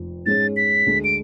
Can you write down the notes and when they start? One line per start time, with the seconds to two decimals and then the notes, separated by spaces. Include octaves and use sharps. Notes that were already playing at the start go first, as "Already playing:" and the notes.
Already playing: F1 F2 F3
0.26 G#2 G#3 C#4 G#4 A6
0.57 B6
0.86 D2 D3 G#3 D4
1.04 D7